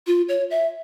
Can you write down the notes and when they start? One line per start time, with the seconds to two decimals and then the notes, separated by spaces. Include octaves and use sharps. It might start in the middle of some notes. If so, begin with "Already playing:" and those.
0.07 F4
0.29 C#5
0.51 E5